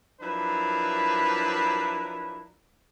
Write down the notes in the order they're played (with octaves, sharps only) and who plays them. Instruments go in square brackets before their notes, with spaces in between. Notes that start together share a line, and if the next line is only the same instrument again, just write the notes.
[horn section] F3 F#3 D4 E4 A#4 B4